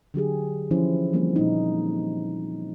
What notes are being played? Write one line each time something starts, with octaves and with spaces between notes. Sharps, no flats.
D3 F#3 G4 G#4
E3 F3 C#4 E4 C5
E3 F3 G3 A#3 C4
A#2 D#4